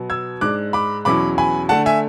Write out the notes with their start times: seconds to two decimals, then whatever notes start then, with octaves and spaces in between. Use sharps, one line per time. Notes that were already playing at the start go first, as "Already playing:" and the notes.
Already playing: B2 F#3 B3
0.10 E6 G#6
0.41 G#2 G#3 D4 D6 F#6
0.73 B5 D6
1.05 E2 B2 F#3 C#4 E4 B5 D6
1.38 G#5 B5
1.69 D3 A3 D4 F#5 A5
1.86 E5 G#5